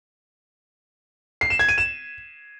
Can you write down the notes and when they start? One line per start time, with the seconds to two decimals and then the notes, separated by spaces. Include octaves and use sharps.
1.41 C7
1.50 E7
1.59 G#6
1.69 D#7
1.78 E7